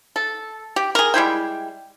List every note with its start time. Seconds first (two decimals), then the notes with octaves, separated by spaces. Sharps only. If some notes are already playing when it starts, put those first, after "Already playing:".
0.16 A4
0.76 G4
0.95 G#4 A#4
1.14 G3 G#3 E4 G5